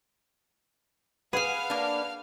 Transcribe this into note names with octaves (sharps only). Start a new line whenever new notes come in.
G#4 B4 F5 F#5 G#5 F6
A#3 D4